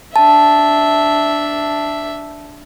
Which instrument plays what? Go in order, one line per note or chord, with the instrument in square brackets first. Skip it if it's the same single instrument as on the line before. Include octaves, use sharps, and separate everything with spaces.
[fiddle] D4 E5 [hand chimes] A5